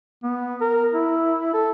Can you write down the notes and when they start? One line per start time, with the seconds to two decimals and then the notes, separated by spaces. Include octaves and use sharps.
0.23 B3
0.61 A#4
0.93 E4
1.54 A4